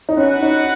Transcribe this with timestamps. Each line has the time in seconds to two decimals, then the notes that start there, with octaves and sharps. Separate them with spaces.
0.09 D#4
0.17 C#4 F#4 B4 F#5
0.42 D#4